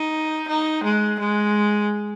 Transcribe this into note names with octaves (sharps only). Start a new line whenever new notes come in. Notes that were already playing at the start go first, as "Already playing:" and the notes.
Already playing: D#4
D#4
G#3
G#3